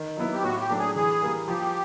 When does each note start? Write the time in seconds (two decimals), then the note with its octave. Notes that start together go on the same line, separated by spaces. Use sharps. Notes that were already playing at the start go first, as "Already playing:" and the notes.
Already playing: D#3
0.17 F#3 B3 E4
0.33 G4
0.43 A2 F#4
0.61 G4
0.70 F#3 A3 D4
0.79 G#4
0.96 E3 G#4
1.22 G3 A#3
1.48 F3 G4